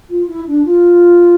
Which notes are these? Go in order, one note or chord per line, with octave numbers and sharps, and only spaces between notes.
F4
E4
D4
F4